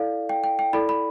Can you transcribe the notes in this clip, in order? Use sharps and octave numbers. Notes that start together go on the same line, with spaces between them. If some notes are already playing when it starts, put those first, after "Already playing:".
Already playing: E4 A4 D5 F5
G5
G5
G5
E4 A4 D5 B5
B5